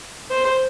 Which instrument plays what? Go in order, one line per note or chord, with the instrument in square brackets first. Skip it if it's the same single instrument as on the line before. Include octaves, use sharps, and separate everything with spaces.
[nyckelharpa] C5